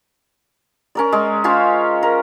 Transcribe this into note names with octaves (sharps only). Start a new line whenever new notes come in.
C#4 A#4 D5
G#3
C#4 F4 C5 F5
A#4